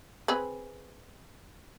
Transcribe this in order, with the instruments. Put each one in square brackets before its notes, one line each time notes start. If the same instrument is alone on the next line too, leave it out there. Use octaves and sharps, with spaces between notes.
[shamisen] C4 G#4 B4